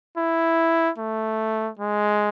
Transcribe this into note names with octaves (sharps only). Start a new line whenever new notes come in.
E4
A3
G#3